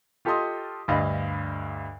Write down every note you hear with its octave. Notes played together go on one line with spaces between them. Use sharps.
F4 G4 A4 D#5 C6 D#6
D2 G2 D#5 F5 B5